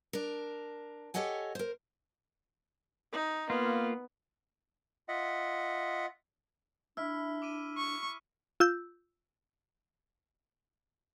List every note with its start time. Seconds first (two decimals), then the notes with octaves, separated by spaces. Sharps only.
0.13 D4 A#4
1.14 G4 A4 C#5 D#5 F#5 G#5
1.55 A#4 C5
3.12 D#4
3.50 A#3 B3 F4
5.08 F4 D#5 E5 F#5
6.97 D4 E4 E6 F6 B6
7.42 D6 D7 D#7
7.78 C#6
8.60 F4 E6 G6